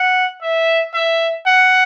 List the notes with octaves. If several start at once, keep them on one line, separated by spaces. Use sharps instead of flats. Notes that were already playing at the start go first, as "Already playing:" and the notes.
Already playing: F#5
E5
E5
F#5